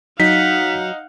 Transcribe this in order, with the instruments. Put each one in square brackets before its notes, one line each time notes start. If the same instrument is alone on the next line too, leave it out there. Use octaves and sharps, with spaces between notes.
[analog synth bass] F#3 [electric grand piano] D#4 [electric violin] F5 F#5 [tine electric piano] B6